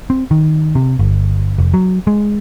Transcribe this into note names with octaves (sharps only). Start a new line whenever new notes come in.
C4
D#3
C3
G1
F1
F#3
G#3